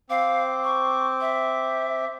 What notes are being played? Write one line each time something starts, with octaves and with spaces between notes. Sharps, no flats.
C4 F5 D6
C#6
E5